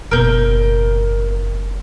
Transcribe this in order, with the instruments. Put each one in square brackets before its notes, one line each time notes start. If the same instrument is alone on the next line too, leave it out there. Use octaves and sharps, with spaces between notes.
[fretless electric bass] F#1 B2 [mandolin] A#4 G6